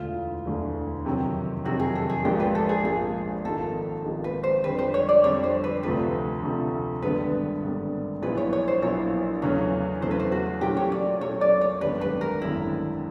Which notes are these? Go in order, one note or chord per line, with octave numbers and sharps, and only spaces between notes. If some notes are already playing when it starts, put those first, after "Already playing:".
Already playing: E1 D2 D3 F4
E1 D2 D3
F2 C3 D#3 F#3
F2 C3 D#3 F#3 F#4
G#4
A4
G#4
A#1 G#2 F3 A#3 G4
B4
A4
G#4
A#1 G#2 F3 A#3 G#4
G#1 G#2 F3 A#3 D#4 A4
G#1 G#2 F3 A#3 D#4
B4
C5
F2 D3 G3 B4
C5
C#5
D5
F2 D3 G3 C#5
C5
B4
D2 C3 F3 A3 B4
D2 C3 F3 A3
G#1 G2 D3 G3 B3 B4
G#1 G2 D3 G3 B3
A#1 A#2 F#3 B3 E4 B4
C#5
C#5
C5
A#1 A#2 F#3 B3 E4 C#5
E2 C#3 F#3 A3 C#4 C#5
E2 C#3 F#3 A3 C#4 C5
B4
C5
F#4
A#2 F#3 A3 C#4 G4
C#5
D5
A#2 F#3 A3 C#4 C#5
D5
C#5
G#1 F#2 D3 G3 B3 B4
B4
A#4
G#1 F#2 D3 G3 B3 E4